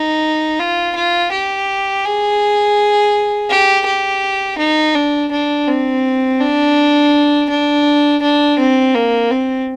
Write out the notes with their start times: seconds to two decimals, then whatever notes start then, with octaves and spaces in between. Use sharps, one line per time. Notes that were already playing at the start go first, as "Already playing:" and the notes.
Already playing: D#4
0.59 F4
0.95 F4
1.32 G4
2.05 G#4
3.50 G4
3.86 G4
4.58 D#4
4.95 D4
5.32 D4
5.68 C4
6.41 D4
7.50 D4
8.22 D4
8.59 C4
8.95 A#3
9.31 C4